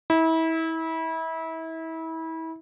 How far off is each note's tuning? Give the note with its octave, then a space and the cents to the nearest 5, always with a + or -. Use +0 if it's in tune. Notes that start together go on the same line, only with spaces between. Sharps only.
E4 -30